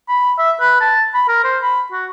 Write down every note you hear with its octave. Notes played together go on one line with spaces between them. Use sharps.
B5
E5
B4
A5
B5
A#4
C5
B5
F#4